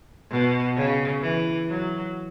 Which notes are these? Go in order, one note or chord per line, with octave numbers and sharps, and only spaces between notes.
B2
C#3
E3
F#3